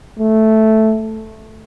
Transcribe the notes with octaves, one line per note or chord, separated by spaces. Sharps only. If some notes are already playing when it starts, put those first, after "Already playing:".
A3